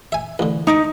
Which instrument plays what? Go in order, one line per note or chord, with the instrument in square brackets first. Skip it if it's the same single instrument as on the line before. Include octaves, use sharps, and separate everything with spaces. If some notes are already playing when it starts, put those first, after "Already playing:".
[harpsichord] E5 G#5
A1 D3
[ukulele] D#4 [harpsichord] A#5 C#6 D6